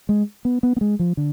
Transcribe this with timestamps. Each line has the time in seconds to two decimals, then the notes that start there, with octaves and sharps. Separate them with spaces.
0.09 G#3
0.45 B3
0.63 B3
0.76 B3
0.81 G#3
0.99 F3
1.17 D3